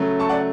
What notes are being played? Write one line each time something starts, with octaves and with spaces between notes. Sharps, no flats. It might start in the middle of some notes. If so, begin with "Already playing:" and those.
Already playing: C#3 F#3 A3
A5 C#6
D5 F#5